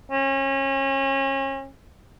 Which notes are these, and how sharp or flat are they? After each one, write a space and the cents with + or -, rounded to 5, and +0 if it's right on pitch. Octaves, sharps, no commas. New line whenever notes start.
C#4 -30